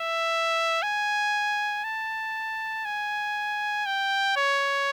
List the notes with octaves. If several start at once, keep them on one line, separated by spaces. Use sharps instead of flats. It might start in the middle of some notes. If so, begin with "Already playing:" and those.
Already playing: E5
G#5
A5
G#5
G5
C#5